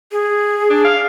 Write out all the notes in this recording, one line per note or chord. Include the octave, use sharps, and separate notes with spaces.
G#4
D4
F5